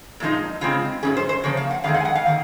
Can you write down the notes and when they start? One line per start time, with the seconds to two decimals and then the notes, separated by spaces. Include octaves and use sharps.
0.20 A#2 F3 G#3 D#4
0.61 C#3 G#3 C4 F4
1.03 G#2 D#3 F#3 C#4 G#4
1.17 C5
1.29 C5
1.43 C#3 F3 A#3 C#5
1.57 F5
1.71 F#5
1.84 F2 D#3 G#3 C4 F5
1.94 F#5
2.00 G#5
2.05 F#5
2.15 F5
2.26 D#3 A#3